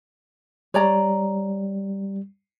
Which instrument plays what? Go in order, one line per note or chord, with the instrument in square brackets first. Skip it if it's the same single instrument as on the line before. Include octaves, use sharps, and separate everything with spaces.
[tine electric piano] G3 [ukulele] C#5 D5 A#5